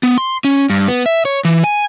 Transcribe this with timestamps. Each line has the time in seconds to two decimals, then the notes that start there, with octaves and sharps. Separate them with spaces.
0.03 B3
0.18 C6
0.44 C#4
0.70 G2
0.88 B3
1.06 E5
1.25 C#5
1.45 E3
1.64 G#5